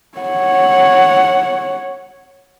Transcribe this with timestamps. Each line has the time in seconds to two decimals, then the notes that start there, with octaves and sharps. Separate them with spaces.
0.18 C#5 F#5